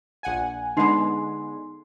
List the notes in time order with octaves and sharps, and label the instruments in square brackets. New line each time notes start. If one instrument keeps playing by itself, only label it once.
[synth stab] A#1 F#5 G#5
[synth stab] D3 G#3 B3 [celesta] D#4 C6 C7